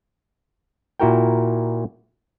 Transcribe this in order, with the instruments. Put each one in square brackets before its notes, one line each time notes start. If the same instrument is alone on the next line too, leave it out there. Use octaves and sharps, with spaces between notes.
[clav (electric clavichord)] A#2 E4 F#4 A#4 G5